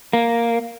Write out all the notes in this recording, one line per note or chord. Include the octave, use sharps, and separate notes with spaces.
A#3